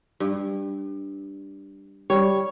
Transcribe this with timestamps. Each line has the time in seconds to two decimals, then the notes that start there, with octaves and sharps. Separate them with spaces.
0.20 G2
2.10 G3 C#5